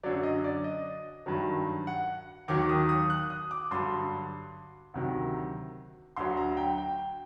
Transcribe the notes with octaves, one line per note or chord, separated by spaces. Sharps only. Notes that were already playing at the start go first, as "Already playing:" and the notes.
F#2 D3 F#3 D5
D#5
D5
D#5
G2 D#3 F#3
F#5
D#2 D#3 F#3 D6
D#6
D#6
F#6
D#6
D6
G2 D3 F#3 C6
D2 C3 D#3 F#3
D2 D3 F#3 C6
A#5
G5
G5